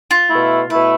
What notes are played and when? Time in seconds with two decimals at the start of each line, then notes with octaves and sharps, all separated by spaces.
0.11 F4
0.30 B2 A3 E4
0.70 B2 A3 E4 B4